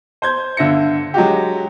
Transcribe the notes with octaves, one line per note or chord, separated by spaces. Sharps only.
C5 G6 G#6
G1 D3 E5 A#6 C#7
F#3 G#3 F#4 G4